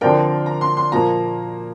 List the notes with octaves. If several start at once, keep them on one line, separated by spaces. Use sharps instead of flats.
D3 F3 C4 A#4 D5 G5
A#5
C6
C6
A#2 F3 A#3 A#5